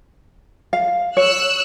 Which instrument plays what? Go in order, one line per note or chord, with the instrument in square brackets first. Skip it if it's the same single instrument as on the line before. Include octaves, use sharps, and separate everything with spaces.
[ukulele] F5
[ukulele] C#5 [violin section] E6 F#6